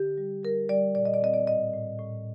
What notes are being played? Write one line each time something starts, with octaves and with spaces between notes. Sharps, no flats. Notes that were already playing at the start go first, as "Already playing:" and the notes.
Already playing: D3 G4
G3
G3 A#4
G3 D5
A#2 D5
D#5
D5
C4 D#5
D5
A2 D#5
A2
A2